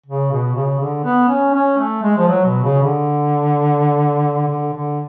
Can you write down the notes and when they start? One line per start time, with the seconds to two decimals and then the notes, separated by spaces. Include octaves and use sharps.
0.06 C#3
0.31 B2
0.55 C#3
0.79 D3
1.04 B3
1.29 C#4
1.54 C#4
1.78 A3
2.03 G#3
2.18 F3
2.27 F#3
2.45 B2
2.64 C#3
2.82 D3
4.48 D3
4.73 D3